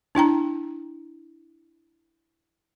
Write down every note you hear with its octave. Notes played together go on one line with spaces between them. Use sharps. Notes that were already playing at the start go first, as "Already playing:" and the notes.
D4 E4 G5 A#5